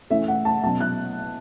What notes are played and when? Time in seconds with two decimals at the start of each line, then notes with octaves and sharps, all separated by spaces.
0.10 E3 A3 C#4 E5
0.28 F#5
0.45 A5
0.63 B2 F#3 C#4 A5
0.80 F#6